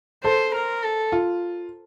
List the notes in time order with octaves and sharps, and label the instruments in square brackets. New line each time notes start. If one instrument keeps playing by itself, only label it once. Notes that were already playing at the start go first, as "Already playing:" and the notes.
[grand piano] A4 [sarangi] C5
[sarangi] A#4
A4
[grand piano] F4